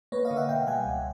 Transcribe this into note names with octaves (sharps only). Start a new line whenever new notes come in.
A#3 B4 C#5
D#5 F5
D3
E5 F#5
B2 F5 G5
G3 F#5 G#5
C#2